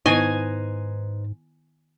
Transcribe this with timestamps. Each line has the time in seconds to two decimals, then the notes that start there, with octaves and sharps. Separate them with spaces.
0.06 G#2 D#3 B3 D#4 E4 B4 C5 G#5